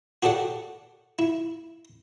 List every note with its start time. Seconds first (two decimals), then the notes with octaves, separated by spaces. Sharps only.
0.23 F#4 G4 A4 D5 F#5
1.19 E4